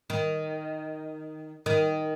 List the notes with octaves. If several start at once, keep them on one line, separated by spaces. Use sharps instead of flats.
D#3
D#3